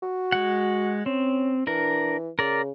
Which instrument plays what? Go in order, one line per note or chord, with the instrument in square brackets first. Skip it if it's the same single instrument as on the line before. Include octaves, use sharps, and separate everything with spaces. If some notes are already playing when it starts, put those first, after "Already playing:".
[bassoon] F#4
[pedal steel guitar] G#3 F#5
[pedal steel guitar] C4 [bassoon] C#4
[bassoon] E3 [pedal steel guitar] D4 A#4
[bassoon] C#3 [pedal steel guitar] A#4 D5